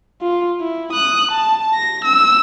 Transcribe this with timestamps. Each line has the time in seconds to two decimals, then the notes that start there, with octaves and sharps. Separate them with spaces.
0.22 F4
0.61 E4
0.93 D#6 F#6
1.32 A5
1.74 A#6
2.04 E6